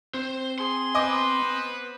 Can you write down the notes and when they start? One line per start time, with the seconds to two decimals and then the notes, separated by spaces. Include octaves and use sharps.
0.14 C4 C5
0.58 G#4 C6
0.95 B3 B4 C5 D#5 G#5 D6